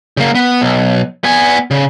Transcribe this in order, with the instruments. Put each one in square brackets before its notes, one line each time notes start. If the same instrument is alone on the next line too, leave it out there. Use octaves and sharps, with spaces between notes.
[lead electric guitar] C#3 A#3
B3
B1
B3 G#5
C#3